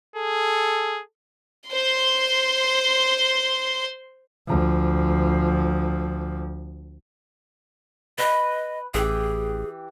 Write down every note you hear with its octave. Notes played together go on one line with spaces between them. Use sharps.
G#4 A4
C5 C6
D2 F3
B4 D#5
A1 E3 G4 G#4